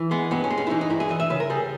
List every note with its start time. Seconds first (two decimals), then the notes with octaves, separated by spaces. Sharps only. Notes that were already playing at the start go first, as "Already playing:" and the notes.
Already playing: E3
0.11 G#3 B3
0.31 G2 B3
0.44 C#4
0.50 G#3
0.58 C#4
0.67 E4
0.70 E3 D#4
0.81 D#4
0.90 G2 E4
1.00 G#4
1.10 E3 D#5
1.20 E5
1.30 C#3 B4
1.40 A#4
1.50 G3 G#4